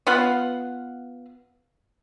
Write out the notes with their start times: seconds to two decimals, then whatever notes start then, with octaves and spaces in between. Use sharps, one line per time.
0.07 B3 F4 F5 F#5